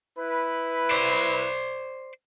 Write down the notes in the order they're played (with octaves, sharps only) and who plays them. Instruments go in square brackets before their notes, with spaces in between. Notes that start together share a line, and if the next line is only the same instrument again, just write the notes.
[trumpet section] E4 B4
[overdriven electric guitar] C5 D5